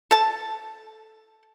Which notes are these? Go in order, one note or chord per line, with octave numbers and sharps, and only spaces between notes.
A4 A5